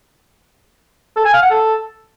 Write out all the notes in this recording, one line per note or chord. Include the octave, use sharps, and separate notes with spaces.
A4
G#5
F5
F#5
A4